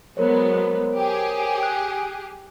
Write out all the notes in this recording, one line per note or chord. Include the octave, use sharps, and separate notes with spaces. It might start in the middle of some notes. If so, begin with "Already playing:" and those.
F#3 G#3 B3 A#4 C5 C#5
G4 G#4
F#6